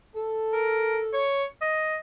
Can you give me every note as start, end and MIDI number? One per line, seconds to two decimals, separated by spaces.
0.15 1.29 69
0.53 0.99 70
1.13 1.44 73
1.62 1.96 75